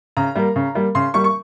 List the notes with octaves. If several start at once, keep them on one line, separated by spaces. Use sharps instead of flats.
C#3 A#5
G3 A#3
C#3
G3 A#3
C#3 C6
G3 A#3 C#6
C#6